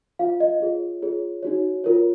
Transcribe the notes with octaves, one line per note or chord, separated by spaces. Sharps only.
F4 C5 F5
D#5
F4 G#4 C#5
F4 G#4 C#5
D#4 F#4 C#5
F4 A#4 C#5